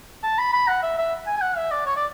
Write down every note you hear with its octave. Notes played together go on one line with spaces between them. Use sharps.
A5
B5
B5
F#5
E5
E5
G#5
G#5
F#5
E5
D5
C#5
D5